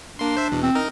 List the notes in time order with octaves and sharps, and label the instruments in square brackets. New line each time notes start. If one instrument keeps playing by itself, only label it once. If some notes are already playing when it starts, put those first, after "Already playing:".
[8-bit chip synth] A#3 C6 [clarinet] D4
[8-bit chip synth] C5 E5
E2 B2
[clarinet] C4
[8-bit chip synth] D#4 A#4